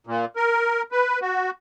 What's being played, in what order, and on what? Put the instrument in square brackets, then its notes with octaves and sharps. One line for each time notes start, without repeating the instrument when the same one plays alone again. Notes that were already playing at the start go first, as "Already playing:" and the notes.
[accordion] A#2
A#4
B4
F#4